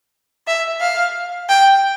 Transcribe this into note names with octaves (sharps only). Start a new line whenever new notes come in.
E5
F5
G5